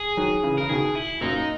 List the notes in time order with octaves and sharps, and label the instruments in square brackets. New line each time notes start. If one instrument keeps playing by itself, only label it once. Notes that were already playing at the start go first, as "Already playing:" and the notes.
Already playing: [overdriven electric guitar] G#4
[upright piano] D#3 F#3
C#3 E3
[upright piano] C#3 [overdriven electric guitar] A#4
[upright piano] B2 D#3 [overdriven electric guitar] G#4
[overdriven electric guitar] E4
[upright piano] F#2 A#2 [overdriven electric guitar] D#4